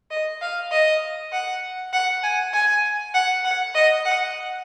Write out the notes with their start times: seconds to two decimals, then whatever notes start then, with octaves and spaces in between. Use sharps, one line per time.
0.11 D#5
0.41 F5
0.71 D#5
1.32 F#5
1.93 F#5
2.23 G#5
2.53 G#5
3.14 F#5
3.44 F#5
3.75 D#5
4.05 F#5